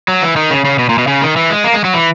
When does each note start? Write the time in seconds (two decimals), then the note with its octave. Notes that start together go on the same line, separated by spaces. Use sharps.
0.08 F#3
0.23 E3
0.36 D#3
0.51 C#3
0.65 C#3
0.79 B2
0.89 A#2
0.98 B2
1.07 C#3
1.22 D#3
1.36 E3
1.50 G#3
1.64 A#3
1.74 G#3
1.84 F#3
1.94 E3